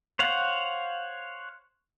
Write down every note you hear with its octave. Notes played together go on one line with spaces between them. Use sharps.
C5 C#5 F5 F#5